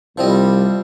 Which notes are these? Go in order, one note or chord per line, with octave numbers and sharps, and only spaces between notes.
C2 F3 G3 C4 D#5